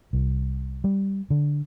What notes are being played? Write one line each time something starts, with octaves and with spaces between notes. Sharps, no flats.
C2
G3
D3